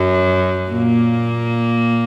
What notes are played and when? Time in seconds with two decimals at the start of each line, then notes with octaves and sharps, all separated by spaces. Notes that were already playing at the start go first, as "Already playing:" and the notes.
Already playing: F#2 F#3
0.70 A#2 A#3